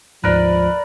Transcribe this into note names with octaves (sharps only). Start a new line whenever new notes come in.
D2 G#2 F3 A#4 B4 D5